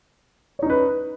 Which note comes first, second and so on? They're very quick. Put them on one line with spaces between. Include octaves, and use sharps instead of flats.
C#5 D#4 C#4 B4